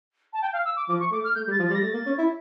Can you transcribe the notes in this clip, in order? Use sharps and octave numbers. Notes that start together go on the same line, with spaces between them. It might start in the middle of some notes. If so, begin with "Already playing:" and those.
A5
G5
F5
E6
D6
F3 D6
C#6
A3 D6
F6
A3 G6
G3
A6
F3
G3 A6
A#6
A3 A6
A#3
C#4
E4